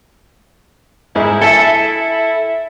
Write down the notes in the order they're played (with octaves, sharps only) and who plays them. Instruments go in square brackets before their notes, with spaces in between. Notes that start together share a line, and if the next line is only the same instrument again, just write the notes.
[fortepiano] G#2 D#4 G#4 [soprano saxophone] E4
[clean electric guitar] A4 A5 [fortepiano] E5 G#5